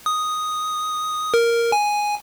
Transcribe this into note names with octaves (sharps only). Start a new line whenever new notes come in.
D#6
A#4
G#5